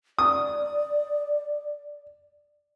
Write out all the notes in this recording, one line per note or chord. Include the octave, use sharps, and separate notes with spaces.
D5 D#6